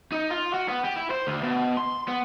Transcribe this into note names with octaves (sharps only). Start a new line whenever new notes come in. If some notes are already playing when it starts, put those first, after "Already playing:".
D#4
F4
F#4
B3
G4
E4
C5
D2
B2
C6
B3